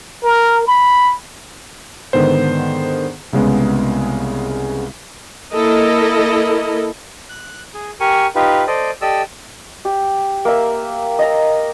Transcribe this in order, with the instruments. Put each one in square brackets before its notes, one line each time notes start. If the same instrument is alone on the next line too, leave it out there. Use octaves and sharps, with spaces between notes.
[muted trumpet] A#4
B5
[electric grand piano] G#2 D3 D#3 B3 C5
C2 C#3 G#3 B3
[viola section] A#3 E4 A4 A#4 D#5
[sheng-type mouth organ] F#6
G#4
G4 A#4 G#5 C#6
D#4 F4 G4 B4
A4 C5 D5 D#5
G4 A4 D5 D#5 E6
[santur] G4
A#3 E5
D#5 A#5